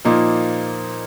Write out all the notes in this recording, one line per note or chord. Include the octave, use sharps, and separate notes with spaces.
A#2 F3 A#3 D#4